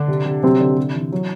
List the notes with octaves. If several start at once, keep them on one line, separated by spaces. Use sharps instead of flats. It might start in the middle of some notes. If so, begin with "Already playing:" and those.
Already playing: D3 D4
C3
C3
C3 F#3 C4
D3
C3
E3
F#3